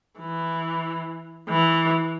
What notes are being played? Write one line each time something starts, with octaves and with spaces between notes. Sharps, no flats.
E3
E3